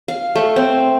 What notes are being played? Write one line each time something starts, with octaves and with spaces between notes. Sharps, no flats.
F5
A3
C4